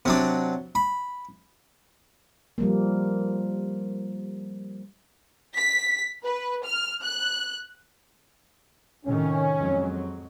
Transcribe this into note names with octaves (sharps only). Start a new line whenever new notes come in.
C3 F#3 D4
B5
F3 G3 A#3
B6
B4
F6
F#6
A2 C3 D#3 C#4
F2 F#3 G#3